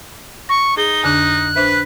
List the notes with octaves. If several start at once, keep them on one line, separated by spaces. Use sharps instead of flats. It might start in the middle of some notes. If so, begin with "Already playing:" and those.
C#6 A#6
D#4 G#4 G7
F2 D3 D4 F#6
D4 B4 C5 E5